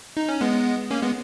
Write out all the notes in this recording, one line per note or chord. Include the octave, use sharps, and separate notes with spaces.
D#4
C#4
G#3 B3
A#3 C#4
G#3 B3